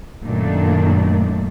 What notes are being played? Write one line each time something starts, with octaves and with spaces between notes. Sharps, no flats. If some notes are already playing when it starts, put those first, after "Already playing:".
F#2 A#2 D#3 A3 D4